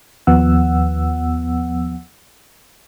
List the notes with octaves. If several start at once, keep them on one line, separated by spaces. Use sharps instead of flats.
D#2 F3 B3 F#5 E6